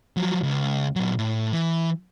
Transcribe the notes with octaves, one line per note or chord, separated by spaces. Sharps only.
F3 F#3
C#2
A#2 F#3
A2
E3